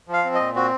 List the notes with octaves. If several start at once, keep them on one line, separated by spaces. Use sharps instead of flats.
F3
F5
C4
D#5
A#2
C4 F#4